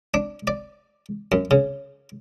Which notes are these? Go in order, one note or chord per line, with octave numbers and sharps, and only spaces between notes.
D4
D5
F#2
C#3